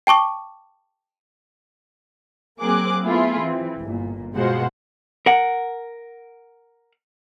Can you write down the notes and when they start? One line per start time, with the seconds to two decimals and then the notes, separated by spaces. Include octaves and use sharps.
0.07 G5 A5 C#6 D6
2.60 F#3 A#3 C4 G#4 D6 F#6
3.05 A3 B3 E4 F4 G#4
3.42 E3 C4
3.79 G1 A#2
4.34 B2 G#3 F4 F#4 C5 F#5
5.26 A#4 F#5